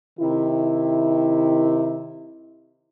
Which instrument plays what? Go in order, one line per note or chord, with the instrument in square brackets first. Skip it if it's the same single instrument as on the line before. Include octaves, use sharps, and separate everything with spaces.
[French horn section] C3 D#3 E4